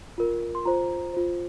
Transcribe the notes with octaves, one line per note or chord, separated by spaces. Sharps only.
F4 A#4
C6
F4 C5 A#5
F4 C5